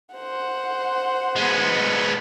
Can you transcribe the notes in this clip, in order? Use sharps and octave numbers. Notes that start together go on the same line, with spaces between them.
C5 F#5
G#3 B3